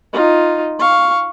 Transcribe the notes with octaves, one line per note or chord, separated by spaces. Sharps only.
D#4 F4
F5 C#6